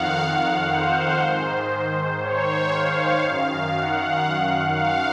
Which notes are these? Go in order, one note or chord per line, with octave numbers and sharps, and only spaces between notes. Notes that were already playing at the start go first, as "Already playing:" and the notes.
Already playing: F2 D#3 F5 F#5
C5
G#2 D#3
C#5
F5
F#2 D#3 F5
F#5
F5